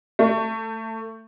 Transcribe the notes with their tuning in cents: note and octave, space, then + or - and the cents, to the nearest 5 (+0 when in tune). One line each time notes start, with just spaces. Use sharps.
A3 +20